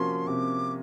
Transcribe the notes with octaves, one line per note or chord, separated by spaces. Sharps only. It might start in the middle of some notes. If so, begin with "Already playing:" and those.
Already playing: C3 F3 A#3 C#4 F#4 C6
C3 D6